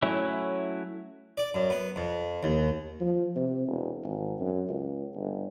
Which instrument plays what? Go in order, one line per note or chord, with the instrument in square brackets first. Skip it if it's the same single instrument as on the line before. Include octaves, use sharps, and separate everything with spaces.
[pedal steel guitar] F#3 A3 C#4 E4
[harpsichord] D5
F#2
B3
F2
D#2
[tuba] F3
C3
E1
G#1
F#2
C#2
G1